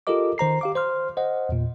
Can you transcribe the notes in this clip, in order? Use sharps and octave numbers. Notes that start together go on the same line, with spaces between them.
F4 G4 A4 A#4 D#5 D6
D#3 C5 A#5 C7
G4 F5 D6
C5 C6 F6
C5 D#5 F#5
E2 A#2